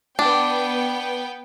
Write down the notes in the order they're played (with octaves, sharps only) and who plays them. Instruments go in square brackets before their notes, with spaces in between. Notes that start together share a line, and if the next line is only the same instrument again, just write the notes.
[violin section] B3 G5 [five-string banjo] D4